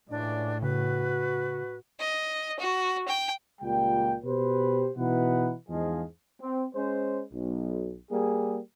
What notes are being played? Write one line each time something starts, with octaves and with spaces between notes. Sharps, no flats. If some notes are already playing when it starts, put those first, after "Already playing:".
C#2 A2 E3 D4 D5
C#3 F#4 B4
D#5
F#4
G5
C#2 A#2 G3 G5
B2 G4 B4 C5
B2 E3 D#4 B4 F#5
E2 G#2 F3 G#4 D#5 F5
C4
G#3 C#4 C5
B1
G3 A#3 G#4